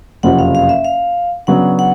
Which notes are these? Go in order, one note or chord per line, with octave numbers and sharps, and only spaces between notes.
F#1 F2 C3 F3 F#5
F5
F5
E5
F5
C#3 F#3 B3 D4 F#4 F#5
F#5